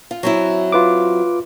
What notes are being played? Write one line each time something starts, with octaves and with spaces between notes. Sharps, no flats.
F4
F#3 C4 E4
F4 B4 D6